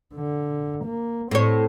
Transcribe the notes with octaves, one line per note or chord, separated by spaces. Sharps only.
D3
A#3
A2 C4 C#5